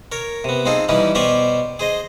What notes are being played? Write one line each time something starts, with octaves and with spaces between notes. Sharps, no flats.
A#4 C#5
C3 B3
C4 D#4 F4 G#4 A4
E3 G3 C#4 D#4 E4
B2 C#4 G4 C5 D5 C#6
G#4 C5 D#5